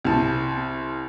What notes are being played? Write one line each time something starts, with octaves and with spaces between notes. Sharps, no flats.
C2 A5